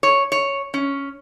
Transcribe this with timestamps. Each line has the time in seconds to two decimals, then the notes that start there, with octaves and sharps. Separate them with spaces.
0.03 C#5
0.32 C#5
0.74 C#4